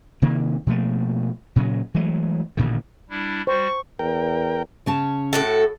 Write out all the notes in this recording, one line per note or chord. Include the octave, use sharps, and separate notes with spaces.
C3 D#3 A#3
B2 F3 A3 A#3
A#2 C#3 F#3
E3 F#3 G#3 A3
A1 A#2 D3 D#3
G3 D4 E4
G3 F#4 C5 C#6
E2 A#4 G5
C#3 C#4 A5
A2 F#4 A4